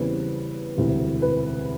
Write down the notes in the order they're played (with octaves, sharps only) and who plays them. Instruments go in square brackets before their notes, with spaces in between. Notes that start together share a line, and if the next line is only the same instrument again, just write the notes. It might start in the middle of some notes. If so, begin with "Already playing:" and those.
Already playing: [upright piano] E2 C#3 E3 G3 C4 B4
E1 D2 C3 E3 G3
B4